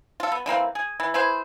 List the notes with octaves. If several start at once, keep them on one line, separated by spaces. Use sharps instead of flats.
F4 A4
B3
D3 E3 A#3 C4
G#4
E3
E4 G#4 B4 C5